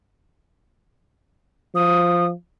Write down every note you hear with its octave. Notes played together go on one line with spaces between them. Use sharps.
F3 D#6